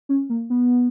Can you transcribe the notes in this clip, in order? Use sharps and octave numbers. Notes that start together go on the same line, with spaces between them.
C#4
A#3
B3